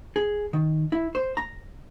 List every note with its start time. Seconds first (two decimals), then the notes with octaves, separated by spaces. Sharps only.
0.16 G#4
0.53 D#3
0.92 E4
1.15 C5
1.37 A#5